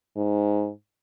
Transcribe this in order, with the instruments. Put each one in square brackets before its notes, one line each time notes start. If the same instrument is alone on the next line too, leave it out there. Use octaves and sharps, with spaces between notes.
[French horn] G#2